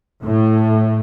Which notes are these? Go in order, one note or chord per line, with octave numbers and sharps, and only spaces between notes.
A2